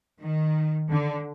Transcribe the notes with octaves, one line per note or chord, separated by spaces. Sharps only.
D#3
D3